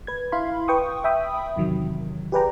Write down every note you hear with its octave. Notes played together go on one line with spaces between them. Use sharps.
B4 G#6
E4 F5 B5 C6
B4 G5 C#6 D#6
E5 G5 B5 D#6
E2 C3 D#3 F#3
G4 G#4 B4 D5 G5 A#5